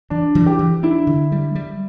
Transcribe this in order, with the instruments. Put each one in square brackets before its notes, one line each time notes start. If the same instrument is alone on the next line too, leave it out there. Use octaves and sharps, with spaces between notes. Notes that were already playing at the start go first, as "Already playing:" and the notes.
[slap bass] E3 [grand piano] D4
[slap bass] E3
[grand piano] G4
[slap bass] E3
[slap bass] D4 [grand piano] E4
[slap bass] D3
G3
G3